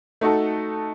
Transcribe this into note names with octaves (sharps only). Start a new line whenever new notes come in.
A3 D#4 F#4 A4